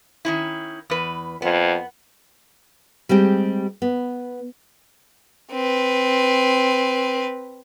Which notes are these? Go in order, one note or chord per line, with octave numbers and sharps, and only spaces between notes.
D#3 C#4 E4
E2 B4
F2 B3
G3 G#3 C4 G4
B3
C4 B4